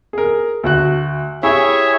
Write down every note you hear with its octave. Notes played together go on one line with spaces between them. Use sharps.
G#4 A#4
D2 F#4 F#6
E4 G4 G#4 C#5 E5